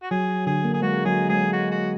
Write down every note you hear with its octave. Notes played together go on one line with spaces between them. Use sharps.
F#4
F#3 G#4
D3 G#4
A#3
G#4
G#3 F#4
F#3 G#4
G#3 G#4
F#4
F#4